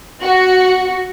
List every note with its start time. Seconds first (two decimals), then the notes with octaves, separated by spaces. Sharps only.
0.22 F#4